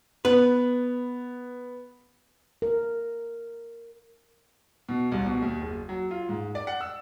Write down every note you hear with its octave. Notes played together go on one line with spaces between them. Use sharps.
B3 B4
A#4
B2
C2
B2
D#2
F#1
F#3
F4
G#2
D5
F#5
E6